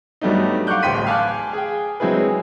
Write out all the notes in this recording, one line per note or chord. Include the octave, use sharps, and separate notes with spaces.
G2 F#3 G3 A3 B3 D#4
F5 F#5 C#6 D6 F#6 G6
D1 A1 G5 C6 B6 D#7
F5 G#5 A5 D6 F6 F#6
G#4 G5
F#3 G#3 C4 E4 G#4 B4